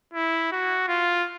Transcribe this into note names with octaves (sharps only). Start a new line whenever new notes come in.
E4
F#4
F4